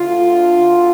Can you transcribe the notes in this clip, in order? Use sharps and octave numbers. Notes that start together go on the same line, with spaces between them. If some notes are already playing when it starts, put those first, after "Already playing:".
Already playing: D2 D3 F4
D2 D3